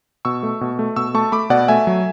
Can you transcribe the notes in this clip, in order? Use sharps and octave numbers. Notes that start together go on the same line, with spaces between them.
B2 C#6 E6
A3
B2
A3
B2 C#6 E6
A3 A5 C#6
A3 B5 D6
B2 D5 F#5
A3 E5 G#5
F#3